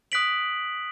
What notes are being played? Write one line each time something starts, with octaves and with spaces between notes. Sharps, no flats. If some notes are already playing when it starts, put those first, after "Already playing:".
D#6 F#6 B6 D7 F#7